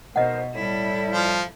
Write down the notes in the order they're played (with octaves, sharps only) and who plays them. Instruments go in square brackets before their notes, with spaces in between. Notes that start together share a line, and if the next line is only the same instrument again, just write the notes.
[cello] B2 [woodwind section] D#4 A#4 C5 [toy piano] D#5 F#5
[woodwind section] A2 G3 [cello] E4 A4
[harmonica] F3